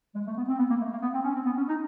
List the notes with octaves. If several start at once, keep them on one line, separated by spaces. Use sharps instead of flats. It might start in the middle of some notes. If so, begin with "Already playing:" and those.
G#3
A3
B3
C4
B3
A#3
A3
A#3
B3
C4
C#4
C4
B3
C#4
D#4